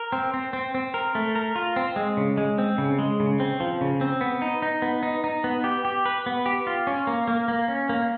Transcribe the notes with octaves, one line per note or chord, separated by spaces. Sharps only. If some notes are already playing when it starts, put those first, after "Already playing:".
Already playing: A#4
C4
C4
C4
C4
A#4
A3
A#4
F4
C4
G#3
C#3
G#3
C4
C#3
G#3
C#3
C4
F3
C#3
C4
B3
D#4
D#4
B3
D#4
D#4
B3
G4
G4
B4
B3
G4
F4
C#4
A#3
A#3
A#3
C#4
A#3